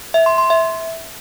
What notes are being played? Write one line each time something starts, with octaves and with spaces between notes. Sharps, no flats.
E5
C6
C6
E5